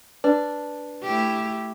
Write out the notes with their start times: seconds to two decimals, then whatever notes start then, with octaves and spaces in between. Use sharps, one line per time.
0.24 D4 B4
1.03 A3 E4 G4